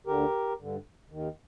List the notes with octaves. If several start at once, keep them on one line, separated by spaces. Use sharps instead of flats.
D2 D3 G4 A#4
G2 D3
D#2 D#3